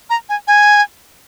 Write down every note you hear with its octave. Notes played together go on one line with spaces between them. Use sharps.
A#5
G#5
G#5